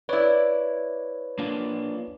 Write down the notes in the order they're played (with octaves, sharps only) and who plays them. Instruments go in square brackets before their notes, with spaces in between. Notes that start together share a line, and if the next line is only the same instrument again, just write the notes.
[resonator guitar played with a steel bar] E4 D5 [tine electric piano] B4 C#5
[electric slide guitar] A#3 D4 F4